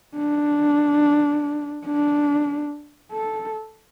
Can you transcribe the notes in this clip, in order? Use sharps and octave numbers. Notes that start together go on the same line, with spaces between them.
D4
D4
A4